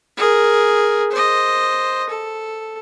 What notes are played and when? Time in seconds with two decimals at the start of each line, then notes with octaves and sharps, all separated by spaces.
0.17 G#4 A#4
1.11 C5 D#5
2.09 A4